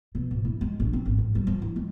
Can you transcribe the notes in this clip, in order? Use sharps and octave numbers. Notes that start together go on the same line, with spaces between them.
B2
G#1
E4
G#3
A#1
C4
G#1
G#2
G3
F3
E4
G#3